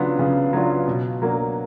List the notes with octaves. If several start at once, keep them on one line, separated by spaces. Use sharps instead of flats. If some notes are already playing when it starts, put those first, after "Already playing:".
Already playing: C#3 F#3 B3 D4 F4
C#3
F#3 B3 D4 F4
B2
F#3 A#3 D4